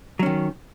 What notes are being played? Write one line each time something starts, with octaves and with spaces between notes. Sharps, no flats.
D#3 F#3 C#4